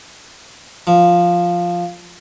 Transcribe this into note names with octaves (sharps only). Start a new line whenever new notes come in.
F3